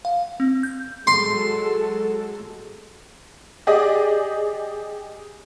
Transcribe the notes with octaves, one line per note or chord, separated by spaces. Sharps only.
F5
C4
G6
F#3 G#3 A4 C6
G4 G#4 D5 D#5